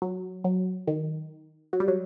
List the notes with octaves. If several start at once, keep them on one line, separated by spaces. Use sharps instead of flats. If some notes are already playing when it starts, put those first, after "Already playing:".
F#3
F#3
D#3
F#3
G3
F#3